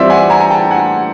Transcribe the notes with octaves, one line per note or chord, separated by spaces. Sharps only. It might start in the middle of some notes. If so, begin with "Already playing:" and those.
Already playing: E3 G3 C4 F4 D5 E5
F#5 G#5
G#5 A#5
A#5
G5 A5
F#5 G#5